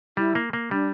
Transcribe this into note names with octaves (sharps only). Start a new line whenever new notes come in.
G3 E4
A#3
A#3
G3 D4